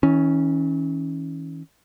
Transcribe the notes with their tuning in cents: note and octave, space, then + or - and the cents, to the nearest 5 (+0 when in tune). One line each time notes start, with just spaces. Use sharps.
E3 -45 C#4 +0